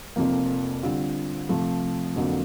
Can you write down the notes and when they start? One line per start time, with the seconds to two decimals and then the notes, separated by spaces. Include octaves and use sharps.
0.16 F1 F2 C3 F3 A#3
0.83 D3 G3 C4 F4
1.49 C3 F3 A3
2.16 F2 D3 F#3 A#3